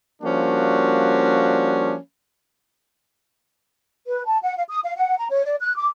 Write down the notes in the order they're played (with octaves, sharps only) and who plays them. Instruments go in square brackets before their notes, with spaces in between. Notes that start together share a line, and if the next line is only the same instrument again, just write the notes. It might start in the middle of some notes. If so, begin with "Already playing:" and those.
[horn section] F3 G3 A#3 C#4 D4 F#4
[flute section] B4
A5
F#5
F5
D#6
F5
F#5
A#5
C#5
D5
F#6
D6